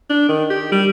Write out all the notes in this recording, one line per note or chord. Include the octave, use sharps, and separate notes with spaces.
D4
D#3
G4
G3